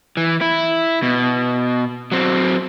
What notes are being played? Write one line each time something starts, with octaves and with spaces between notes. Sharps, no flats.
E3
E4
B2
F#3 C4